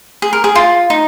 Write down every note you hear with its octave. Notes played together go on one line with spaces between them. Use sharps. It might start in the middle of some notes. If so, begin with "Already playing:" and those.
G#4
A#4
G#4
F4
D#4